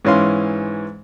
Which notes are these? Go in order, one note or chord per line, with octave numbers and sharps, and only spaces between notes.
G#2 E3 C#4 F5 C6